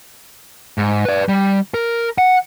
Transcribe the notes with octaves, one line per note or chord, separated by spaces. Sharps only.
G#2
B4 D5
G3
A#4
F#5